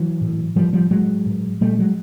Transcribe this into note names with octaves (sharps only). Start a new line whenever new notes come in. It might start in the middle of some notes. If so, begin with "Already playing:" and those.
Already playing: E3 F#3
A2
A2 F3 G3
F3 G3
A2 F#3 G#3
A2
A#2 G3 A3
F#3 G#3